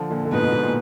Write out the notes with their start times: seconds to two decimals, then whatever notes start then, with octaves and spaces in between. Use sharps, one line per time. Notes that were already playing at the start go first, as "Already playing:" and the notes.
Already playing: D3 F3
0.10 A#2 D3
0.25 D3
0.31 G#2 B2 B4
0.42 G#2
0.52 G#2
0.63 A#2